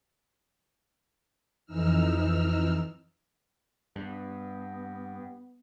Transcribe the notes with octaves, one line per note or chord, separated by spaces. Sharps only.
F2 E3 D#4 E6 F6
G2 B3